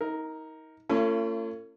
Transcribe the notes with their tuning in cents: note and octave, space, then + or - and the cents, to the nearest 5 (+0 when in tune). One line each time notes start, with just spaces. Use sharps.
D#4 +30 A#4 +0
A3 +45 C#4 +0 F4 -40